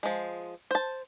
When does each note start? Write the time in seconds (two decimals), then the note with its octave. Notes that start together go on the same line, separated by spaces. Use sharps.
0.03 F3 G#3
0.71 C5 A5